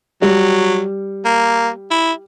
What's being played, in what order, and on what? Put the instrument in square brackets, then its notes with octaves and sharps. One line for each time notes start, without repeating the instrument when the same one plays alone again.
[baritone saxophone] F#3 [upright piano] G3
[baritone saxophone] A#3
E4